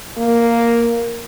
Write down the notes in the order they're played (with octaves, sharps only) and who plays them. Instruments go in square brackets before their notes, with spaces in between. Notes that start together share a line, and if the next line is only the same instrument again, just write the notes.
[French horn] A#3